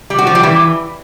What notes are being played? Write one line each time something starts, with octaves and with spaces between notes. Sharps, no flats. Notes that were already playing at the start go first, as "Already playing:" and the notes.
G3
F#4
F3
G3
E3